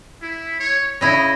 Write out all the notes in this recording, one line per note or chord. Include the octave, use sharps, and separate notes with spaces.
E4
C#5
C#3 E4 D#5